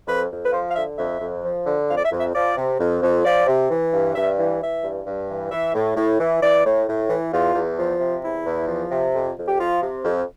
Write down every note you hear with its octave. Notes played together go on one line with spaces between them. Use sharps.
F2 B4
F2
B4
F3 C5
F5
D3 E5
F2 E5
F2
F3
D3
F2 F5
D5
E5
F2
E5
F3 D5
C3
F2
F2
F3 D5
C3
E3
G2
G2 E5
E3
E3 E5
G2
G2
E3
E3 E5
A2
A2
E3
E3 D5
A2
A2
E3
E2 F4
E2
F3
C3
E2 E4
E2
F3
C3
F2
F2
G4
F3 F4
C3
F2